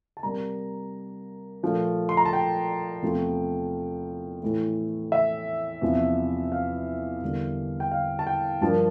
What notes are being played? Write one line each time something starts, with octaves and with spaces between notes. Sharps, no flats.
A5
C3 G3 A#3 A#5
A#2 F3 A3
C6
A#5
A5
G5
E2 C3 F3 A3
A2 E3 A3
E5
E2 C3 F3
F5
E2 D3 G3 A#3
G5
F5
A5
G5
G2 F3 A#3 A5